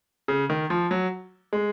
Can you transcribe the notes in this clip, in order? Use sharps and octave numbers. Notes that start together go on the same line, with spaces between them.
C#3
D#3
F3
F#3
G#3